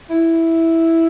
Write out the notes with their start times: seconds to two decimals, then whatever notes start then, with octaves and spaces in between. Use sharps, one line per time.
0.10 E4